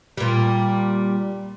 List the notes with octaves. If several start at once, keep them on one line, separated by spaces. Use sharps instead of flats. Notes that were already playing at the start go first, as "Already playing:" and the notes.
A#2 G3